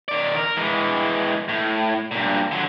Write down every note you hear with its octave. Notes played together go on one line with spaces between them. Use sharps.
D#3 D5
A#4
E3 G#3
A2
G2 A#2
D3 F#3